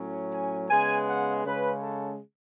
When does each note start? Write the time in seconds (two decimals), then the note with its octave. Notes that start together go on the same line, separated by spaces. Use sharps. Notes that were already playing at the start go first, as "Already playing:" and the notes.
Already playing: A2 F#3 C#4
0.31 G#5
0.69 C#3 G#3 B3 G#5
1.06 F#5
1.44 C#3 G#3 C#4 B4
1.81 A4